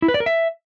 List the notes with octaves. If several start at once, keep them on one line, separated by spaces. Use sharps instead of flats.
E4
B4
D5
A#4
E5